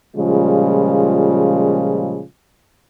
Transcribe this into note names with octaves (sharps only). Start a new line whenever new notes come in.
A#2 C#3 F3 G3 G#3 F4